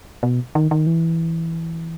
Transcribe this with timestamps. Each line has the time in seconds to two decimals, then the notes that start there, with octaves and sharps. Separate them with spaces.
0.23 B2
0.55 D#3
0.71 D#3
0.87 E3